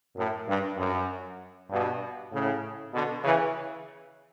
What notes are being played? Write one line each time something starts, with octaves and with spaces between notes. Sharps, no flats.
F#2 A2
G2
F#2
G2 B2
A2 C#3
B2 D3
C#3 E3